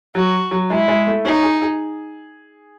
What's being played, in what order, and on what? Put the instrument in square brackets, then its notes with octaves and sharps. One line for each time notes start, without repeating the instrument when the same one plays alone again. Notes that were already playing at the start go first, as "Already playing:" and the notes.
[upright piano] F#3 [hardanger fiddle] F#4
[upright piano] F#3
[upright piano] G#3 [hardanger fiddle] E4
[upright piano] G#3
A3
[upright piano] C#4 [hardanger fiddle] D#4
[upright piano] G#4
G#4